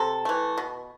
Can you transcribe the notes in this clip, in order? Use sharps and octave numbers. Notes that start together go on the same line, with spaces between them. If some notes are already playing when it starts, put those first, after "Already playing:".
Already playing: C3 A4
E3 A3
B2